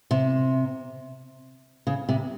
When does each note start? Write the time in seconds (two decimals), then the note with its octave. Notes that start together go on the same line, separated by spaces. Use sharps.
0.11 C3
1.87 C#3
2.09 C3